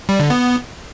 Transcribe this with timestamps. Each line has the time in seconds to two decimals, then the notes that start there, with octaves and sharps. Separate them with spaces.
0.09 G3
0.19 D3
0.30 B3